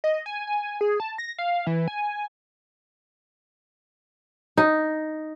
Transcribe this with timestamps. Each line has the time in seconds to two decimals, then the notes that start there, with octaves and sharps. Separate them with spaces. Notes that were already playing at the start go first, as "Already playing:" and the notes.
0.04 D#5
0.26 G#5
0.47 G#5
0.81 G#4
1.00 A5
1.18 A#6
1.38 F5
1.67 E3
1.88 G#5
4.58 D#4